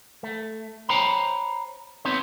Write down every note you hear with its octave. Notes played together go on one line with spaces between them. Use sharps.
A3
C5 C#5 G5 A#5 B5
B3 C4 D#4 C#5